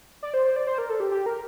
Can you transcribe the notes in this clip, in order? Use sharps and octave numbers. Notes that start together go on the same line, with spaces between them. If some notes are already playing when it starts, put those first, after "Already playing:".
D5
C5
C5
D5
C5
A#4
A4
G4
G4
A#4